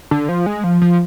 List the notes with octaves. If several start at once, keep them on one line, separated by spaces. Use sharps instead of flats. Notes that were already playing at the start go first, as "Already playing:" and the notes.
D3
F3
G#3
F3
F3